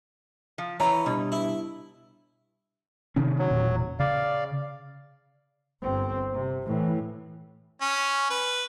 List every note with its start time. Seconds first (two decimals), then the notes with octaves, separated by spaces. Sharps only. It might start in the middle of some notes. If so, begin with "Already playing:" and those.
0.58 F3
0.80 E3 C#4 B4 A#5
1.06 G2 B2
1.32 E4
3.16 C3 D#3 C#4
3.38 F#3
3.51 E1 A#2
4.00 C#3 D5 F5
5.82 G1 C4
6.34 C3
6.66 A2 E3
7.82 C#4
8.30 B4